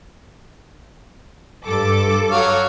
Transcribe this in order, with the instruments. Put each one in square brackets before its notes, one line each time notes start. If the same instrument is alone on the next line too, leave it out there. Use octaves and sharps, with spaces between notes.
[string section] G2 A4 D6
[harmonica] F#3 C#5 F5